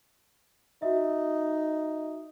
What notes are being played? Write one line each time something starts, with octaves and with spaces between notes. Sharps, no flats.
D#4 F#4 E5